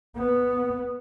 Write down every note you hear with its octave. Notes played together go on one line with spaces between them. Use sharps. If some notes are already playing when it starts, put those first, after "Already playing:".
B3